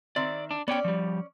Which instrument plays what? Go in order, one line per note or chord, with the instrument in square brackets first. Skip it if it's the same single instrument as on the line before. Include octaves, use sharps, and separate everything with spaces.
[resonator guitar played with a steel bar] D#3 C4 E5 [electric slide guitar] D5
[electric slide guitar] D4
[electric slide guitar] B3 C#5 G5 [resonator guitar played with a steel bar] C#4 D5
[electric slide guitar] F3 G3